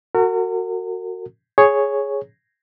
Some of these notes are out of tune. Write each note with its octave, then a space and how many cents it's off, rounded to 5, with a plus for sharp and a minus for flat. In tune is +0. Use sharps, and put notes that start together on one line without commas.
F#4 +0 A#4 -40
G#4 +0 C#5 +0